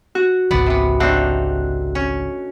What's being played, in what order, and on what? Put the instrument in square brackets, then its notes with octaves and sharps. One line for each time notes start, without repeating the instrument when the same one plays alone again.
[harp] F#4
[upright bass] G#1 C#2 [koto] B3 D5
[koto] C3 B3
[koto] A3 C4 D#4 [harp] D4 F#5
[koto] C#4